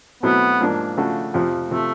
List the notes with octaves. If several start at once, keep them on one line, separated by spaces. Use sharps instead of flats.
B2 F#3 A3 B3 C4 E4
G#2 F3 A#3 D4
C#3 F3 A3 D4 F#4
F2 C3 F3
C3 F3 A3